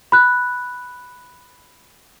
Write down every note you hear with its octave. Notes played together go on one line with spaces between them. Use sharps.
B5 F#6